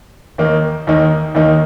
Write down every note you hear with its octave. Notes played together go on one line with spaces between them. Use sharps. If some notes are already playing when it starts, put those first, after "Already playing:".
D#2 D#3 A#3 D#4
D#2 D#3 A#3 D#4
D#2 D#3 A#3 D#4